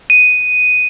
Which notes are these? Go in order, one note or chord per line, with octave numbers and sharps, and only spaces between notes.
D#7